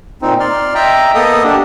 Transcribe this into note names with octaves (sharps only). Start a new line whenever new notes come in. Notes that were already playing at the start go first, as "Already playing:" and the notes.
A#2 C4 D#4
D5 C6 F6
D#5 E5 G5 A#5
A#3 B3 A4 D#5 D#6
D4 G4